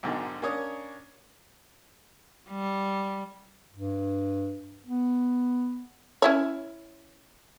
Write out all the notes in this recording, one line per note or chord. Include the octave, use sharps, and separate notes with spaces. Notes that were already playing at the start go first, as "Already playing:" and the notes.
B1 G#2 D3 D#3 G#3
A#3 C#4 D4 C#5 D#6
G3
G2
B3
C#4 E4 C#5